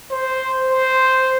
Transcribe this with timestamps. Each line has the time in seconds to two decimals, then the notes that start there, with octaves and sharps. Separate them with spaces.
0.11 C5
0.71 C5